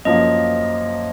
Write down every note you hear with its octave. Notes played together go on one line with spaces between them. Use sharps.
F#2 F3 A#3 D#5